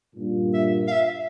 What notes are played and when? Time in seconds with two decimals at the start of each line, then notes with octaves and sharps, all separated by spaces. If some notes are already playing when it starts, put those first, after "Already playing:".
0.15 G2 A#2
0.54 E5
0.88 F5
0.92 E5